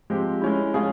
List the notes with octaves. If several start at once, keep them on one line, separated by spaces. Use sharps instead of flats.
F3 G#3 C4 G4
G#3 C#4 E4
F3 G#3 C#4 F4 G#4